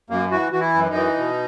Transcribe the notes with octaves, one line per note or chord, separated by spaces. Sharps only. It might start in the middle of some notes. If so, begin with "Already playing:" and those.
F#2 A#3
E3 F#4
E3 F#4
E4
F#2
D#4
E3
B2